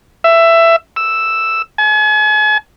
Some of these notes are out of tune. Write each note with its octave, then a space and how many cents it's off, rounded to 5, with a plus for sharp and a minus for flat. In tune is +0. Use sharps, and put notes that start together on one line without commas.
E5 +15
E6 +0
G#5 +40